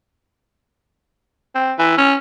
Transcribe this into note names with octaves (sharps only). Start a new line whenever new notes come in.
C4
E3
C#4